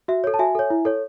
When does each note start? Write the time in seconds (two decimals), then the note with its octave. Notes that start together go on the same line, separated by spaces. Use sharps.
0.08 F#4 E5
0.24 A4 C#5
0.34 A5
0.39 F#4 E5 G#5
0.55 A4 C#5
0.70 E4
0.85 A4 C#5